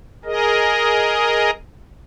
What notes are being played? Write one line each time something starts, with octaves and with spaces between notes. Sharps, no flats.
G#4 A#4 D#5